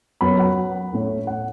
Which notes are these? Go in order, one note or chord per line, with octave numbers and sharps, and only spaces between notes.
F#2 F#3 B3 B5
F#5
A2 A3 C#4
F#5